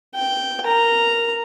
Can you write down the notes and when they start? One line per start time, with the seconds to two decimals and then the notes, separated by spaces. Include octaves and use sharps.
0.15 G5
0.65 A#4 A#5